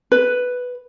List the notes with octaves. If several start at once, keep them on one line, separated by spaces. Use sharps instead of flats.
B4